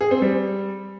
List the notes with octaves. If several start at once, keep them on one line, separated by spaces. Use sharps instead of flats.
G#4
C4
G3